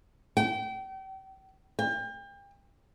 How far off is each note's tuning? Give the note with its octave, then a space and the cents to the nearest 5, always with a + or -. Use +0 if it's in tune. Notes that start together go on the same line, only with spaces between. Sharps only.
G5 -35
G5 +35